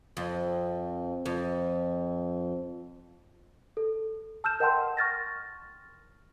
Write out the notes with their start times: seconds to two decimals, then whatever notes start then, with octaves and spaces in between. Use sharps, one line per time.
0.17 F2
1.26 F2
3.77 A4
4.44 A5 E6 F6 G6 E7
4.60 A#4 D#5 F#5 G5 A5 C6
4.97 C#6 F6 A6 A#6